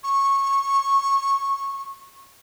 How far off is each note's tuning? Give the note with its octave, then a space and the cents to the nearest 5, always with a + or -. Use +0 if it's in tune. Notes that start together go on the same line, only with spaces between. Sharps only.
C#6 -20